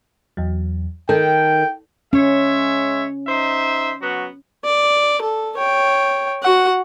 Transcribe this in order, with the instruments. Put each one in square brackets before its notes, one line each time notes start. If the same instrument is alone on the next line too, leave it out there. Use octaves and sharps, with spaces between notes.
[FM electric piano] E2 F#3
[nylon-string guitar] D#3 [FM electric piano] A4 [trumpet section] G5
[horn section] G#3 C#5 E5 [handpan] C#4
[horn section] D#4 C5 E5
F#3 B3 F#4
[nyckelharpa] D5
A4
C#5 G5
F#4 F#5